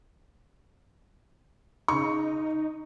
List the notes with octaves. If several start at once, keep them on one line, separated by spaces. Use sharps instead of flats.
C#3 D#4 C#6